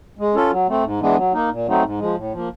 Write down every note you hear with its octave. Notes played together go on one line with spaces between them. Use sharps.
G#3
C#4 F4 A4
F#3
A3 C4
G#2
E3 G#3 B3 D4
F#3
A#3 D#4
A#2
F#3 A3 C4 D#4
G#2
F3 G#3
A2
F3 A#3